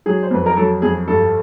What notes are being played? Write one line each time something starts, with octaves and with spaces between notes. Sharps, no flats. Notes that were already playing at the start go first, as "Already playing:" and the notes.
F#3 G#4
C5
F2 B4
A#4
F#3 A4
F2 G#4
G2 A4